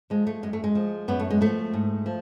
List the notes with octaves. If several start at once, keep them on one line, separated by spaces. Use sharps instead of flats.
F3 G#3
A3
F#2 G#3
A3
G#3
F3
F#2 B3
A3
G#3
F3 A3
G#2
F3